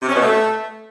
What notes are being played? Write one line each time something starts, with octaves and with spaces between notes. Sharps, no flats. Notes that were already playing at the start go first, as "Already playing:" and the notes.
C3
C#4
B2
A3